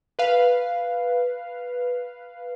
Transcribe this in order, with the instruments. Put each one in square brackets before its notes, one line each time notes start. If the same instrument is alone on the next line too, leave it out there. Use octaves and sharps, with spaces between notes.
[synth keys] B4 F5